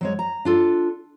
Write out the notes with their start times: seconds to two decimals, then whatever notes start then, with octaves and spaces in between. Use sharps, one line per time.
0.01 F#3 G#3 C#5
0.19 A#5
0.45 D4 F4 A4